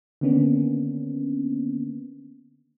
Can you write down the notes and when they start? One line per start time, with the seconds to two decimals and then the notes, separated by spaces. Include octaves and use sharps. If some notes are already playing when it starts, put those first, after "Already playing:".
0.21 D3 D#3 A#3 B3 C#4 D4